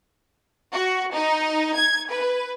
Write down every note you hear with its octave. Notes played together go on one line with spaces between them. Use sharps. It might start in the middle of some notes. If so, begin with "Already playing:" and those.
F#4
D#4
G#6
B4